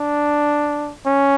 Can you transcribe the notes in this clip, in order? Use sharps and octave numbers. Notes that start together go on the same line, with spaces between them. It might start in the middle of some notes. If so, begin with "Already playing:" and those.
Already playing: D4
C#4